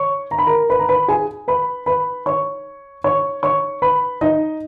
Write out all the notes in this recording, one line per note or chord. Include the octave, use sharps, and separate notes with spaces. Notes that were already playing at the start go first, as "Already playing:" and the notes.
Already playing: C#5 C#6
A#5
B5
A#4 A#5
B4 B5
A#5
B4 B5
G#4 G#5
B4 B5
B4 B5
C#5 C#6
C#5 C#6
C#5 C#6
B4 B5
D#4 D#5